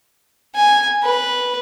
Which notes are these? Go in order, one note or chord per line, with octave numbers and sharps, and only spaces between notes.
G#5
B4